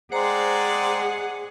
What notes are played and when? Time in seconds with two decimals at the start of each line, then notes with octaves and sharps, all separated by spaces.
0.12 G#3 C4 G#4 C5 D5 F#5 A#5